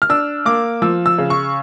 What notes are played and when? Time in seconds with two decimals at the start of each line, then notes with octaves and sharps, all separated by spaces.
0.02 F6
0.09 D4 E6
0.45 A#3 D6
0.82 F3 E6
1.06 E6
1.18 C#3
1.30 C#6